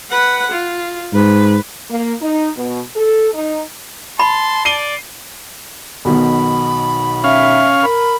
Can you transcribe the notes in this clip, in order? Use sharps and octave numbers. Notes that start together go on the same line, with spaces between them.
B4 F#5
F4
G#2 B4
A#3
D#4
B2
A4
D#4
A5 B5 C6
D5 C7 D#7 G7
B1 B2 D#3 B5
C#4 E5 F5
A#4 B5